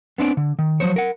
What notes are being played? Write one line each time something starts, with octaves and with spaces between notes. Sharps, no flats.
B3 C4 D4 D5
D3
D#3
F3 F#3 A3 C5 C#5
A#4 F#5